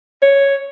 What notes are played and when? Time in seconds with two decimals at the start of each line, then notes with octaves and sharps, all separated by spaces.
0.22 C#5